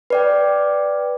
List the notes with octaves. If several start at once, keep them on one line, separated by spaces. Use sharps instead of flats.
B4 D5 G5